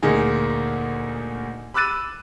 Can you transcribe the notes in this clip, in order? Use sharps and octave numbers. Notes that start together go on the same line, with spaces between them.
D2 A#2 D#4 G#4
B5 D6 E6 F#6 A6 D#7